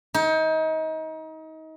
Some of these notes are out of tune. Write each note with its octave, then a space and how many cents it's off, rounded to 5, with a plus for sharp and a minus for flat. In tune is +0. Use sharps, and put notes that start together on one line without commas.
D#4 +30